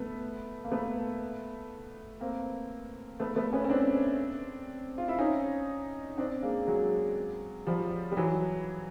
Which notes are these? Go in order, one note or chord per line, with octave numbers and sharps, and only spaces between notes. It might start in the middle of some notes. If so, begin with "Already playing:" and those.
Already playing: A3 B3
A#3
A3 B3
A#3 C4
A3 B3
A3 B3
B3 C#4
C#4
C4 D4
F4
E4
C#4 D#4
C4 D4
G#3 A#3
F#3 G#3
F3 G3
G3
E3 F#3